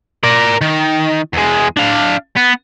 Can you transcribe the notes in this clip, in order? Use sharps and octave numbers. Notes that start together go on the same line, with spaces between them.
A#4 D5
D#3
E2 G#3
D4 F5
B3